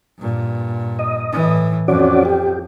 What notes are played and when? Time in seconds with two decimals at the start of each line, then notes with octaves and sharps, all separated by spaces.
0.18 G2 A#2
0.99 D#5
1.33 A2 E3
1.88 F2 C#4 F#4 D5
2.25 G4